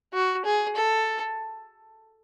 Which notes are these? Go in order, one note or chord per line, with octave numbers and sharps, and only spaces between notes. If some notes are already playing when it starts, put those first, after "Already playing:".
F#4
G#4
A4